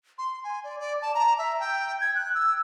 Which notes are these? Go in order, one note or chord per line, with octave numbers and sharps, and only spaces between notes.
C6
G#5
D5
D5
A5
A#5
E5
G5
G#6
F#6
E6